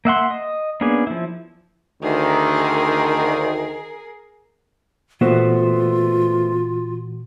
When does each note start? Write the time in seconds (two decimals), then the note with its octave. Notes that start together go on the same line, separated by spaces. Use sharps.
0.05 A#3 E5 F#5 C6
0.30 D#5
0.81 A#3 B3 C#4 D4 G#4
1.07 F3 E4
2.02 D2 D#3 G#4 A#4
5.21 A#2 E3 A3 B3 F4 F#4 C5